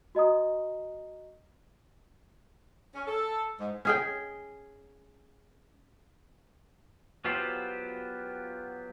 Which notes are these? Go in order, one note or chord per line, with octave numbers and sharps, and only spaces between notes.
F#4 D#5 A#5 D#6
C#4
A4
G#2
C#4 G#4 G5
F#3 B3 F4 G4 C5